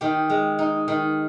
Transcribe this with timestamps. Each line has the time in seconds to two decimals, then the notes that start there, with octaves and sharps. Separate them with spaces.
0.01 D#3 G4
0.30 G#3
0.59 D#4
0.88 D#3